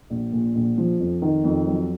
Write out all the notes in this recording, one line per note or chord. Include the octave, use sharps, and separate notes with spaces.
A#1
A#2
A#1
F3
F2
D#3
F2
F#3